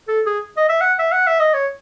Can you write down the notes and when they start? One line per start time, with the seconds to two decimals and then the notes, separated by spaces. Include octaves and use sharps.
0.08 A4
0.26 G#4
0.57 D#5
0.69 E5
0.81 F#5
0.99 E5
1.12 F#5
1.27 E5
1.40 D#5
1.54 C#5